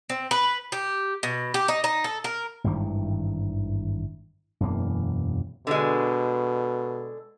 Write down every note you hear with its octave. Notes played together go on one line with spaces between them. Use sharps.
C4
B4
G4
B2
G4
D#4
D#4
A4
A#4
G#1 G2 D#3 E3
E1 F#2 E3 A#3
B2 D3 G#3